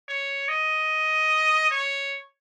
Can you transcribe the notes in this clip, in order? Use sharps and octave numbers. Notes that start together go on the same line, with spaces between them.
C#5
D#5
C#5